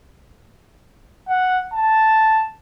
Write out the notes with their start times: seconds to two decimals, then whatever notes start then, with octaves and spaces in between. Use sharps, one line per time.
1.28 F#5
1.74 A5